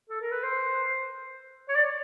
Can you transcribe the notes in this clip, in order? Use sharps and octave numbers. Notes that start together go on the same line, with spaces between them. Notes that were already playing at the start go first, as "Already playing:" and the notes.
A4
A#4
B4
C5
C#5
D5